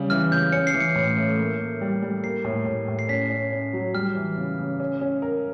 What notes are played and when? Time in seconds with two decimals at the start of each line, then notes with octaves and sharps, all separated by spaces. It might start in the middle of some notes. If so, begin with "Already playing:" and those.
Already playing: C#3 G3
0.10 E3 F6
0.31 C#3 G6
0.53 C#4 C#7
0.67 C7
0.74 E3
0.80 C#7
0.96 A2
1.17 A3
1.39 A#3
1.60 A#3
1.81 G3
2.02 G3
2.23 A#3 C7
2.44 A2
2.66 A2
2.88 A2
2.99 C7
3.09 C#4 B6
3.30 C#4
3.52 C#4
3.73 F#3
3.94 G3 F6
4.16 E3
4.38 C#3
4.59 C#3
4.80 C#4
5.01 C#4
5.22 A#4